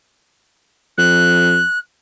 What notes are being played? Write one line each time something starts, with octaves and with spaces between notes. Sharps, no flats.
F2 F#6